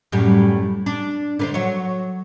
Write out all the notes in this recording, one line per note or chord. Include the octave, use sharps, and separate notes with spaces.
F#2 A2 G3
D4
D3 B4 C5
F#3 C#5